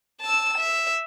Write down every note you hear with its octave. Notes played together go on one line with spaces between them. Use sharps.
A5 E6
E5